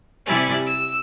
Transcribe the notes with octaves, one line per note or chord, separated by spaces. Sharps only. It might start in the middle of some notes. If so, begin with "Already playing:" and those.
C3 G3 E4 D5 G#5
E6